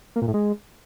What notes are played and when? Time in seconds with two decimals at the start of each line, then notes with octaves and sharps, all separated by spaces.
0.16 A#3
0.22 A#2
0.28 A2
0.34 G#3